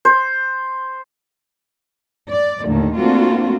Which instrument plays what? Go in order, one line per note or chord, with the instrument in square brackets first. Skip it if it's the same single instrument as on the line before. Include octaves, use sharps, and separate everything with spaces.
[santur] C5
[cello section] D5
D#2 A2 D3 D#3 A3
A3 A#3 C4 D4 F4 F#4